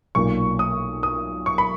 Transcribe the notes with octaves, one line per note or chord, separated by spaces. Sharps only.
B1 A#2 C#6
D#6
D#6
C#6
B5